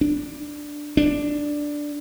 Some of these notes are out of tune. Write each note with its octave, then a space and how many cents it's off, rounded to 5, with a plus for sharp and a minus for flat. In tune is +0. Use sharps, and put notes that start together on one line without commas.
D4 +5
D4 +0